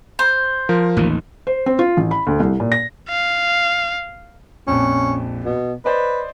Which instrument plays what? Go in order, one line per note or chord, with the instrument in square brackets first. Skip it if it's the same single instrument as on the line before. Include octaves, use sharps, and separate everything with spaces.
[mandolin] C5
[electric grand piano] F3 A#4
[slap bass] A1 D#2 D#3
[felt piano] C5
C4
F4
A1
B5
D2
C2
A#2
A#6
[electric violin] F5
[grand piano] A#1 F2 [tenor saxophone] C#4
[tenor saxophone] B2
[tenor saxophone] B4 [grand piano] C5 D5 D#5